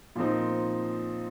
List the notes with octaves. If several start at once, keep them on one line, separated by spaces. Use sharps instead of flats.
A#2 F3 C4 D#4